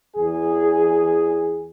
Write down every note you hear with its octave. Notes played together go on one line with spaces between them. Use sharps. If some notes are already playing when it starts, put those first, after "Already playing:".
E2 G#4